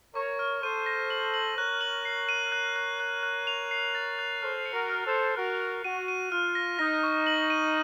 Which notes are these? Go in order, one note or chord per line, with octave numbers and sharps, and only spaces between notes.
A#4 C#5 C#6
F6
A4 C5 D#7
A#6
F#7
F#7
A#4 C#5 F#6
F#7
C7
D#7
F#6
F#6
F#6
F#6
F7
C7
A6
F#6
A4 C5 F6
C#7
F#4 A#4
F6
A4 C5
C#7
F#4 A#4 F#6
F#6
F#4 D#7
D#7
F4 F6
A#6
D#4 A#6
C#6
F#7
D#7